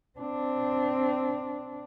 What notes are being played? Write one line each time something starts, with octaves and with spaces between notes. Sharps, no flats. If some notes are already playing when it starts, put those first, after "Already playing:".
C4 D4